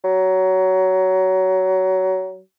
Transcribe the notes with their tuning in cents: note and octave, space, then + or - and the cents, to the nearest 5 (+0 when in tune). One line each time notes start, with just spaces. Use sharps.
F#3 +20